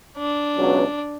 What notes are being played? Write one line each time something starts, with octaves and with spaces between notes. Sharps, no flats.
D4
C#2 B2 F#3 C#4